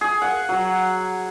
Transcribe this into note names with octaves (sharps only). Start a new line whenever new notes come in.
G#4
F#5
F#3